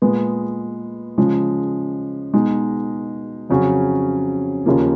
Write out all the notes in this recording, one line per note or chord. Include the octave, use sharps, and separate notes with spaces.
A#2 G#3 B3
C#3 F3 G#3
B2 G#3 D#4
F2 C#3 F#3 C#4
D#2 C#3 F3 A#3